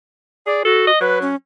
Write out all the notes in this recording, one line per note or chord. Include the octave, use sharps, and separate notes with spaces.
G#4 D5
F#4 A4
D#5
F#3 B4
C#4